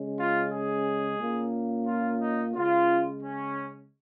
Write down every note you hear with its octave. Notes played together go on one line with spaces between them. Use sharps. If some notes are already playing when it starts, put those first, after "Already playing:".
Already playing: C#3 G#3 C#4
F4
G#4
A#2 A#3 C#4
F4
D#4
C#3 G#3 C#4 F4
C#4